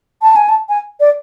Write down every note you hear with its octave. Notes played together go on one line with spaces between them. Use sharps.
A5
G#5
A5
G#5
D5